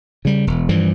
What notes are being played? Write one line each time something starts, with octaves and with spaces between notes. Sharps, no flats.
C#3 G3
E1
G2 E3 F3 G3